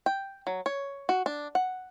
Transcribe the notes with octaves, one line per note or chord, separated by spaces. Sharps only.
G5
F#3
C#5
F#4
D4
F#5